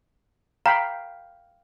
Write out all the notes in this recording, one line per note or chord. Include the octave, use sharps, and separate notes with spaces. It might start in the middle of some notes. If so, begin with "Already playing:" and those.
F5 G5 A#5 B5